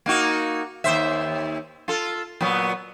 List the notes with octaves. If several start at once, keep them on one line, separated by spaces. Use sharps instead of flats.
A#3 D#4 F#4
D#2 C5 E5
F4 A4
A#2 F#3 B3